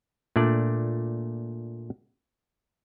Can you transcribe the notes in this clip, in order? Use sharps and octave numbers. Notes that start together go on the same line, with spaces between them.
A#2 A3 D4 D5